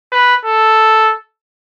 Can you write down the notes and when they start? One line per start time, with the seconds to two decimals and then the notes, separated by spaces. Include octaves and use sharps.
0.12 B4
0.45 A4